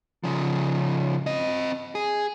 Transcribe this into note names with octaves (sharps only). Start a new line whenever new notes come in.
C#3 F3
C4 D#5
G#4